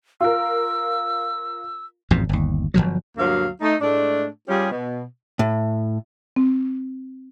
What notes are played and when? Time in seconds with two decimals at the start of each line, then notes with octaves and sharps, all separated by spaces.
0.21 F4 A#4 E6
2.11 A1 F2 G#2 B2
2.29 G1 D#2
2.74 G1 D#2 F3 F#3
3.17 D2 G2 F#3 A#3 F5
3.61 A3 D#4
3.81 A2 G#3 A3 D4
4.48 G3 C#4 F4 G4 G#4
4.71 B2
5.39 A2
6.36 C4